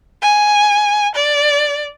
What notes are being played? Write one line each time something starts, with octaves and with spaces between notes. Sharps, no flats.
G#5
D5